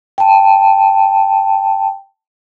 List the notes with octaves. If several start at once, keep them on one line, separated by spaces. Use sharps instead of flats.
G5 A5